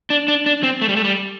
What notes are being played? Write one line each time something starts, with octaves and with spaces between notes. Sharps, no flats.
D4
D4
D4
C4
A3
G3
A3
G3